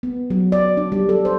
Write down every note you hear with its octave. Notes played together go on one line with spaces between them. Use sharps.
B3
F#3
D5
D4
G3
A4
C5